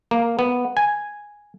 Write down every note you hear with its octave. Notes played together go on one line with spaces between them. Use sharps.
A#3
B3
G#5